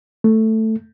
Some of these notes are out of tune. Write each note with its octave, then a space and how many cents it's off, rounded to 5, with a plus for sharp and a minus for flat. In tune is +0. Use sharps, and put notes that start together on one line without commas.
A3 +5